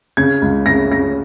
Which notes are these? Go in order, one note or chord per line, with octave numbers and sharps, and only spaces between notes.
C#3 G#6
C#2
C#3 A#6
C#3 A#6